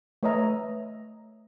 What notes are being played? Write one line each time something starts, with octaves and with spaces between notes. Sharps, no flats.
A3 B4 C#5 D#5 E5 A#5